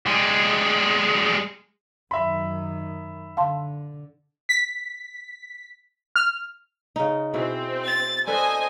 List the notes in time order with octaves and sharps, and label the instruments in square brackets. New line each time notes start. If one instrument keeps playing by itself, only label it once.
[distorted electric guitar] G3 G#3
[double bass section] F#2 D#3 [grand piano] E5 B5 [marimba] C6
[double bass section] D3 [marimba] F5 A5 C6
[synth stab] B6
F6
[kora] C#3 D#4
[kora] B2 E4 G#4 [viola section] C4
[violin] A6
[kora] D4 A4 B4 [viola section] C5 D#5 [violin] G#5